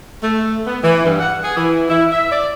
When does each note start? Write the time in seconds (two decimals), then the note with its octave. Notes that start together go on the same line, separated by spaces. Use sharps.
0.22 A3
0.66 B3
0.83 E3
1.04 G2
1.20 F#5
1.43 G#4
1.57 E3
1.89 E4
2.11 E5
2.31 D5